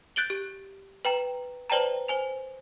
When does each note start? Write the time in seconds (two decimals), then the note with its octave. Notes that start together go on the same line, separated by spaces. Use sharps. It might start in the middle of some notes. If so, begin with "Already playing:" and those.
0.16 F#6 G6 A6 D7 F#7 G7
0.30 G4
1.05 B4 G5 A#5
1.70 B4 C5 D5 G5 A5 A#5
2.08 C5 G#5 F7